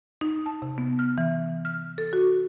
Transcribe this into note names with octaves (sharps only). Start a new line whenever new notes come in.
D#4
A5
C3
B3
F6
E3
F6
A4
F#4